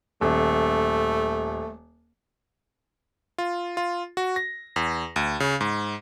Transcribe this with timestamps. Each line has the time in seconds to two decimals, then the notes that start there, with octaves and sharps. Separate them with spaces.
0.21 D#1 A3
3.38 F4
3.77 F4
4.17 F#4
4.36 A#6
4.76 E2
5.16 D2
5.40 C#3
5.61 G#2